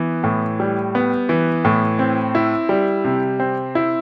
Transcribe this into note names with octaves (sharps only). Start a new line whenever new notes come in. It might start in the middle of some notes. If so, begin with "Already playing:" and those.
Already playing: E3 B3
A2
G3
B3
E3
A2
C4
E4
G3
C3
C4
E4